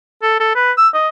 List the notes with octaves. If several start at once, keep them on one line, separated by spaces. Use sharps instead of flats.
A4
A4
B4
E6
D#5